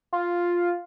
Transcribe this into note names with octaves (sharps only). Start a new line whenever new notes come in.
F4